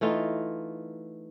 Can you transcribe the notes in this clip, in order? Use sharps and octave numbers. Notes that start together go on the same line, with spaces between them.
E3 A3 D#4 F4